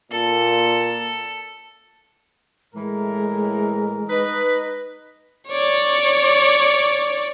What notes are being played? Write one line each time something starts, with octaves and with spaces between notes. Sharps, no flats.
A#2 A4
A2 E3 G#3 A#4
D#4 B4 D#5
C#5 D5